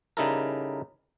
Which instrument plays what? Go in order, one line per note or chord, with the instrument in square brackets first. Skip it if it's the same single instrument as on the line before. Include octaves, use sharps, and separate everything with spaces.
[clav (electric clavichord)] C#3 G3 D#4 E4 A4 A#4